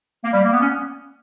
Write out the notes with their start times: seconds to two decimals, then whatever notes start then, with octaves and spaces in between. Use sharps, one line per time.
0.25 A#3
0.34 G3
0.43 A#3
0.52 B3
0.62 C#4